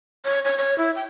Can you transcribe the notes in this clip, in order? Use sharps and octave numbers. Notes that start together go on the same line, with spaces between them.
C#5
C#5
C#5
E4
G5